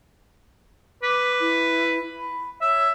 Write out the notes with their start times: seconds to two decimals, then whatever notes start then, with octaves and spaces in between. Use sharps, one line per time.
1.03 B4 D6
1.40 E4
2.17 B5
2.62 C#5 E5